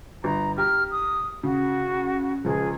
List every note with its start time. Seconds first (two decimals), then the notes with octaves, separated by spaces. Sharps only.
0.24 G1 A#5
0.58 G4 A#5 F6
0.91 D#6
1.43 C#3 F#4
2.45 C#2 F3 G#4